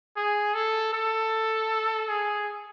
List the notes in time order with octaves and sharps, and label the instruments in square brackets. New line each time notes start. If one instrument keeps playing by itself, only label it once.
[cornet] G#4
A4
A4
G#4